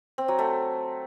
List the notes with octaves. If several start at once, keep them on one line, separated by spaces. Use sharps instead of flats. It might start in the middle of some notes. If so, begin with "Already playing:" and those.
C4
F#3
A3